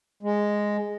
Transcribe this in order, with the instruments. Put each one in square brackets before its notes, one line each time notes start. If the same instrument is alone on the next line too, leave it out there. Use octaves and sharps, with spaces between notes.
[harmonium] G#3